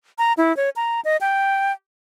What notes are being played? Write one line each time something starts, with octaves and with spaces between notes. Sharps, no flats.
A#5
E4
C#5
A#5
D#5
G5